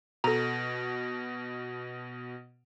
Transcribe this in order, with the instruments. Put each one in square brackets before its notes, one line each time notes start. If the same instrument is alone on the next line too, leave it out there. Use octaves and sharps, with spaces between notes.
[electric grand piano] B2 [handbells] A4 A#5